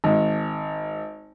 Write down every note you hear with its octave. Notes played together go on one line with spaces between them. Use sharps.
G#1